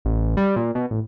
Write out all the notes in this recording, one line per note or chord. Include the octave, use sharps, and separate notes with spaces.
A1
G3
A#2
B2
A1